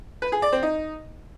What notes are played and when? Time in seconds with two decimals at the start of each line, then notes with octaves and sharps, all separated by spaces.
0.22 B4
0.32 G#4
0.42 D5
0.52 C4
0.63 D#4